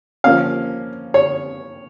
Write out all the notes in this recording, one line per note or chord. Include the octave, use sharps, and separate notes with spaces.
F3 A#3 C#4 F5
C#5